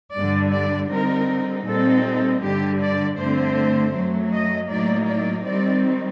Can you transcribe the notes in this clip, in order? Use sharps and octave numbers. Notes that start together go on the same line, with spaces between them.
G2 D3 G3 D4 D5
D5
D3 G3 C4 D#4 A#4
A#2 G3 C4 D#4 A4
G2 D3 G3 G4
D5
G2 D3 A3 C4 C5
F#2 F#3 A3
D#5
A2 F#3 A#3 D#4 D5
D5
D#3 G3 C4 D#4 D5